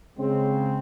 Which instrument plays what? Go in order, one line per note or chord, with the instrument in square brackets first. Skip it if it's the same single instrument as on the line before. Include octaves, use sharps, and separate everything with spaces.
[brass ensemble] C#3 G#3 C4